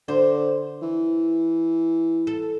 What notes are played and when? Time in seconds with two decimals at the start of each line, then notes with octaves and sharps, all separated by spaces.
0.08 D3 C5
0.82 E3
2.27 A4